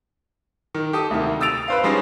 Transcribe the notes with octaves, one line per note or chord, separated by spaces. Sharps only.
D#3
G4 A4 D#6
D2 C3 D#3
D#6 E6 A6 D7 F7
B4 C5 F5
F3 G3 G#3 C#4 D#4